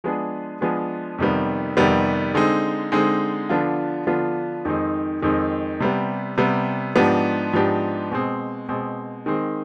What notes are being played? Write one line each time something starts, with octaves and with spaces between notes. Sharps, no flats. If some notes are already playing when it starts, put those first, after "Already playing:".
F3 G#3 B3 D4 G#4
F3 G#3 B3 D4 G#4
F2 C3 D#3 G3 B3
F2 C3 D#3 G3 B3
D3 G#3 C4 D#4
D3 G#3 C4 D#4
D3 F3 B3 D4 F4
D3 F3 B3 D4 F4
F2 D#3 G#3 C4 D#4
F2 D#3 G#3 C4 D#4
C3 G3 B3
C3 G3 B3
G#2 F3 B3 D4 G4
G#2 F3 B3 D4 G4
B2 G#3 C4
B2 G#3 C4
D#3 G#3 C4